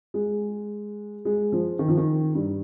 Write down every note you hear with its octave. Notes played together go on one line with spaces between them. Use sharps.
G#3
G#3
F3
D#3
F3
D#3
G2